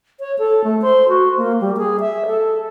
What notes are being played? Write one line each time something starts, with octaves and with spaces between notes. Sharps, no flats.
C#5
A4
A3
C5
F#4
A#3
G3
G#4
E5
A4